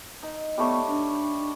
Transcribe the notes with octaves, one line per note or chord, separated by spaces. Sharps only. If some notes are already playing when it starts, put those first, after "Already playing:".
D#4
G3 A3 B3 C#5
D4